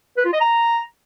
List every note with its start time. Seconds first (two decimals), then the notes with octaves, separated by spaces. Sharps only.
0.17 B4
0.25 F4
0.33 D#5
0.40 A#5